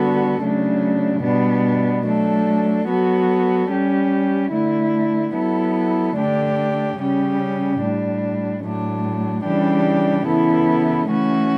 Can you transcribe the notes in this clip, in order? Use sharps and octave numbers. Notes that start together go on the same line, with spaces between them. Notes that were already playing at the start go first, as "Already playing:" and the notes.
Already playing: D3 G3 B3 F#4 A4
C#3 F#3 A3 D4
B2 G3 B3 D4
F#3 A3 D4 A4
F#3 B3 F#4 A4
G3 C#4 G4
D3 A3 E4
F#3 B3 E4 A4
D3 A3 D4 G4
C#3 G3 C#4 G4
A2 G3 D4
A2 F#3 A3 D4
C#3 E3 G3 D4 G4
C#3 E3 B3 E4 A4
E3 A3 C#4 F#4